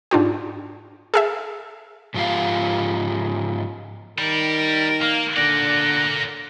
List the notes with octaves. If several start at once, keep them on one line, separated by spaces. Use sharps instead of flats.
G#2 D4 F4 G4
G#4 A4 E5
G#2 F3 F4 G4 F5
D#3 G3 A#4
A#3 F5
D3 A#3 D5 F#5 A#6